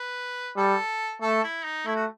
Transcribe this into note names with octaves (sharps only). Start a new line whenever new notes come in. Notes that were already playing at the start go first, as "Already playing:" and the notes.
Already playing: B4
G3 A4
A3 A4
E4
D#4
A3 E4
F#4